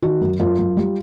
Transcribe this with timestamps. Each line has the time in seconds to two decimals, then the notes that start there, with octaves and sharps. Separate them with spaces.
0.02 D#3 F#4
0.21 F#2
0.40 F#2 F4
0.58 F#2
0.77 G3